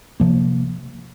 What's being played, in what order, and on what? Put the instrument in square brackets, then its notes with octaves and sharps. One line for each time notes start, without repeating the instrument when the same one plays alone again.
[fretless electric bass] C3 F3 A#3